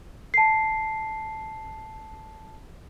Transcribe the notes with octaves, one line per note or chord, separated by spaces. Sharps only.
A5 C7